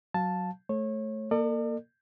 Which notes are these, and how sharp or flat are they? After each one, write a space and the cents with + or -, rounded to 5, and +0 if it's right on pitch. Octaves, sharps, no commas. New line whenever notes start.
F#3 +0 F5 +15 A5 +0
A3 -15 C#5 -25
A#3 +0 A4 +45 D5 +40